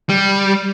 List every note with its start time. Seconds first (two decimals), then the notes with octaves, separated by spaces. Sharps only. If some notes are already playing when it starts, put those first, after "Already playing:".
0.09 G3